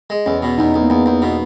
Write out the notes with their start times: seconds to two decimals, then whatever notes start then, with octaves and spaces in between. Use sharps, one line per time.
0.10 G#3
0.26 E2 C#4
0.42 B2
0.58 E2 D#4
0.74 E2
0.83 A#3
0.90 E2 B3
1.06 E2
1.22 B2